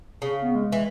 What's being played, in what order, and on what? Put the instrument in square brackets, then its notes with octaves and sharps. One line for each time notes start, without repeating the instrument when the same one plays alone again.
[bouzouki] C#3
[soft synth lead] B3
G#3
[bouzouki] E3